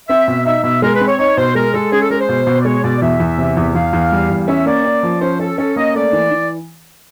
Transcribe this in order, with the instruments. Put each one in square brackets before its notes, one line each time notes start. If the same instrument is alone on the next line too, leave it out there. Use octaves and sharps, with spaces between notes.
[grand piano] C4 [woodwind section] E5
[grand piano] B2
[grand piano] D#4 [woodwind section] E5
[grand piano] B2 [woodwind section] E5
[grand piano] G#3 [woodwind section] A#4
[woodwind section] B4
[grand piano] C4
[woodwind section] C#5
[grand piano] D#4 [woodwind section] C#5
[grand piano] B2 [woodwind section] C5
[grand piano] G#3 [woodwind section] A#4
[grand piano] G#3 [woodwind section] A4
[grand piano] C#4 [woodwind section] G#4
[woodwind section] A4
[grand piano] G#3 [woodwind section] A#4
[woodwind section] C5
[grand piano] B2
B2
[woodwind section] D5
[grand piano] G#3 [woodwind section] C#5
[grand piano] B2 [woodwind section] D5
[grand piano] E2 [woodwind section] E5
[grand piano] E2
C3
E2
[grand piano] E2 [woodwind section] F5
[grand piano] E2
G3
E2
[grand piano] C#4 [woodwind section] E5
[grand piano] A#3 [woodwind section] D5
[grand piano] C#4
F3
[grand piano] C#4 [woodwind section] C5
[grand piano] C#4 [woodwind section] A4
[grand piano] C#4 [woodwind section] A4
[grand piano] A#3 [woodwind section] D#5
[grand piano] A3 [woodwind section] D5
[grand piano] E3
E3